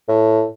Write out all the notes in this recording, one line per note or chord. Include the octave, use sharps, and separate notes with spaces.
A2